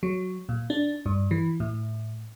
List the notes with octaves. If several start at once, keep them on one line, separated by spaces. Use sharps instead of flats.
F#3
A#2
D4
G2
E3
A2